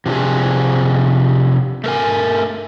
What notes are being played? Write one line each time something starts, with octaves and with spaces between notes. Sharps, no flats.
C3 F3 D4 G#4
A3 A#4 G#5